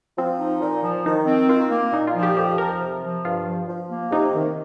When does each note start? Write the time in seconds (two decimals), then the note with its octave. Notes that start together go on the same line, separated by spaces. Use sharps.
0.18 F3 C4
0.40 D#4
0.62 A#2
0.84 F3
1.06 D#3 D#4
1.27 C4
1.49 D#3 F4
1.71 A#3
1.92 A#2 D#4
2.07 F4
2.15 F3
2.23 G4
2.37 F2 G4
2.58 F3 A#4
2.80 C3
3.03 F3
3.25 G2 F4
3.46 F3
3.68 F3
3.91 A#3
4.11 C3 D#4
4.34 D#3